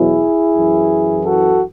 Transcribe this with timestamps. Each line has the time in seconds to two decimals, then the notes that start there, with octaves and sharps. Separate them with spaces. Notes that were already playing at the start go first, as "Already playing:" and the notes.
Already playing: E2 B2 F#3 E4 G#4
0.55 F#2 E3
1.24 F#4 A4